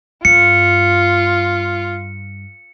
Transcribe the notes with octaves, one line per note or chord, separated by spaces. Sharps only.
G2 F4 C#7